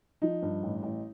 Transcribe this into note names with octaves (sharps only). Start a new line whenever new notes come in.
F3 D#4
G2
A1
A1